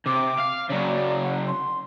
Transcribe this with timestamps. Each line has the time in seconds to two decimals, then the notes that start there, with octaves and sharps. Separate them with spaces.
0.06 C3 D6
0.39 F5
0.69 C#3 F#3 D5
1.23 F#5
1.46 C6